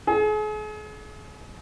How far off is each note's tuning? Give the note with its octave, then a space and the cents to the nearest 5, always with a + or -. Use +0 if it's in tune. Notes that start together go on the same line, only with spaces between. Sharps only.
G#4 +40